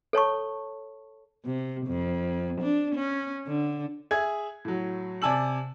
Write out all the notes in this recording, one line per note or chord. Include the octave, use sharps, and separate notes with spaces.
A4 C#5 A5 C#6
C3
F2
D4
C#4
D3
G#4 E5 G#6
A2 F#3
C3 D5 G#5 A5 E6 F#7